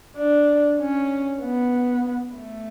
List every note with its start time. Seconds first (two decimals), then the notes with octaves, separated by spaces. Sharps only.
0.16 D4
0.79 C#4
1.42 B3
2.36 A3